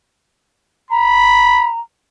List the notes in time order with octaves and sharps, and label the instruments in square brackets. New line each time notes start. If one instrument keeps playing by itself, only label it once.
[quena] A#5 [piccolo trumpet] B5